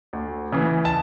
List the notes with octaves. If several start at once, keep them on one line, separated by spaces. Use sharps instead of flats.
D2
C#3 E3
A5